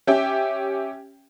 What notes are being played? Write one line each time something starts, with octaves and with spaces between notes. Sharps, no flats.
C#4 G4 E5 G5